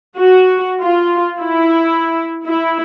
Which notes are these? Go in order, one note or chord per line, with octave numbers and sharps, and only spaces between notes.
F#4
F4
E4
E4